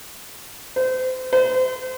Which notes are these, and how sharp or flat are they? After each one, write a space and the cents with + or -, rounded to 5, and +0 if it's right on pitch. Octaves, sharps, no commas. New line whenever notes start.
C5 -30
C5 -35